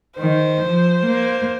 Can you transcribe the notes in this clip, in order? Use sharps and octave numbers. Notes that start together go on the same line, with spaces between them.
D#3 C5
F3
A#3